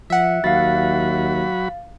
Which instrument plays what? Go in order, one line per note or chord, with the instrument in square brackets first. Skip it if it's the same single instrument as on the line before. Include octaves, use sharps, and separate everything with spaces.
[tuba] F3 [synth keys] E5 F#5
[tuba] D#2 [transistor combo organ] F#3 F#4 B5 [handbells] F5 A6